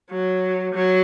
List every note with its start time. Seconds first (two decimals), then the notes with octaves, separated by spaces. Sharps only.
0.11 F#3
0.74 F#3